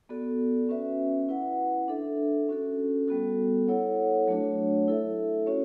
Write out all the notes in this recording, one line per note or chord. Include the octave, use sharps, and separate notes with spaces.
B3 F#4 A4 D5
C#4 F#4 B4 E5
E4 B4 F#5
D4 A4 E5
C#4 F#4 A4
G3 B3 F#4 A4
E4 A4 C#5 F#5
F#3 A3 D4 F#4 C#5
E4 A4 E5
C#4 F#4 C#5